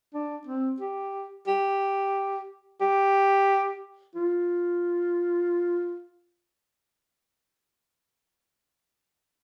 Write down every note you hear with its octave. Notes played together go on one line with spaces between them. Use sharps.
D4
C4
G4
G4
G4
F4